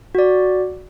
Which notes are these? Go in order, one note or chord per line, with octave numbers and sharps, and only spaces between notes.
F#4 D5